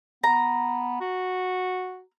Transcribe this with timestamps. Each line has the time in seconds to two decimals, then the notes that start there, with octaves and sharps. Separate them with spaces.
0.24 B3 A#5
1.00 F#4